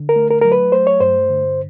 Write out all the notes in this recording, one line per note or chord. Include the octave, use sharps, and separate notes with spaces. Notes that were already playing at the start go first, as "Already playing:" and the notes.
Already playing: D3
A#4
A3
A#4
F#3 A#4
B4
A3 C5
C#5
G2 C5
D3